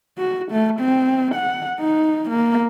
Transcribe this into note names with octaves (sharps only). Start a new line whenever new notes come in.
F#4
A3
C4
F#5
D#4
A#3